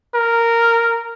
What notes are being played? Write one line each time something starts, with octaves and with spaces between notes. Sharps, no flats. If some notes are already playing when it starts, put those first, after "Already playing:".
A#4